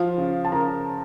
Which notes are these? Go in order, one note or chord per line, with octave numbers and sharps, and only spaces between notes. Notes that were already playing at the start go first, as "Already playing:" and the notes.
Already playing: F3 F4 F5
C#3
A5
C#3 A#4 A#5